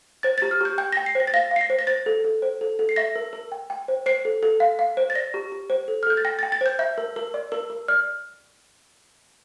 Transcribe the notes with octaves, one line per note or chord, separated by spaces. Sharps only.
C5 A6
G4 A6
F6
G4 G6
G5 G6
G5 A#6
C7
C5 A#6
A6
F5 A#6
F5 C7
A#6
C5
A#6
C5 A6
A4
A4
C5
A4
A4
C7
E5 A#6
A#4
A#4
G5
G5
C5
C5 C7
A4
A4
F5
F5
C5
A6
D5 A#6
G4
G4
C5
A4
F6
A4 G6
A6
G5 A#6
G5 A6
A6
C5 G6
E5 G6
A#4
A#4
D5
A#4
A#4
D5 F6